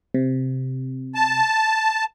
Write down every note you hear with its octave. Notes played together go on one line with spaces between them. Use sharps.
C3
A5